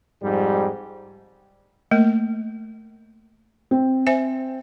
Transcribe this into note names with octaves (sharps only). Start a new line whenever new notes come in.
F2 G#2 G3
A3 A#3 A#4
C4
C5 E5 G#5